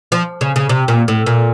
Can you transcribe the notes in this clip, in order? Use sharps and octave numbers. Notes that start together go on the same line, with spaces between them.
F3
C#3
C#3
C3
A#2
A2
A#2